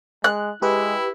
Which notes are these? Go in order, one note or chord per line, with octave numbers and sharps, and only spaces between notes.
G#3 F#6
G#3 E4 G4 B4